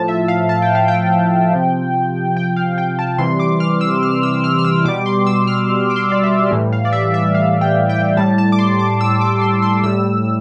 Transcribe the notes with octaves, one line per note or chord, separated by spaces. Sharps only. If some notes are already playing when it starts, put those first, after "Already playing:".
Already playing: A2 F3 A5
E5
F5
A5
G5
F5
G5
C3 F3
G5
F5
G5
A5
C3 E3 G3 C6
D6
F6
E6
F6
E6
F6
F6
E6
B2 G3 D6
C6
E6
F6
D6
C6
D5
E5
A2 E3 G3
F5
D5
E5
E5
F5
G5
G5
A2 G3 A5
A5
D6
C6
D6
E6
D6
C6
C6
A2 G3 E6